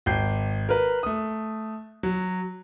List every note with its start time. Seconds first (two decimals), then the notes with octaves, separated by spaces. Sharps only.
0.06 G#1 G5 G6 C7
0.69 A#4 B4
1.03 A3 D#6
2.03 F#3